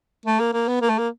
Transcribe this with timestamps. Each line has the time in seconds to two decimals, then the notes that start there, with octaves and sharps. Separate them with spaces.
0.26 A3
0.40 A#3
0.53 A#3
0.68 B3
0.81 A#3
0.90 A3
0.98 A#3